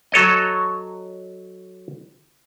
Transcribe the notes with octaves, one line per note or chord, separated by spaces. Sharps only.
F#3 A4 C#5 D#5